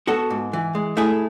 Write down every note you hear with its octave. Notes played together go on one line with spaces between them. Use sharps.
B3 F#4 A4
G#2
E3
G#3
A3 E4 G#4